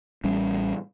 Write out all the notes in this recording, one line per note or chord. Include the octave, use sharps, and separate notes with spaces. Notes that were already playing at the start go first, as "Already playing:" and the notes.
A1 G3 C#4